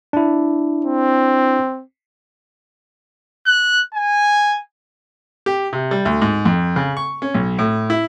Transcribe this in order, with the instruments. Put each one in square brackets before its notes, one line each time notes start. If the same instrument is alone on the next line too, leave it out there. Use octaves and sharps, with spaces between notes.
[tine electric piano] D4 E4
[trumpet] C4
[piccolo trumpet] F#6
G#5
[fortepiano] G4
C3
G3
D2
G#2
F2
C#3
C#6
C#4
B1
A2
E4